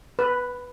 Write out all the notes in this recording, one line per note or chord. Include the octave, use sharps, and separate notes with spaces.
B4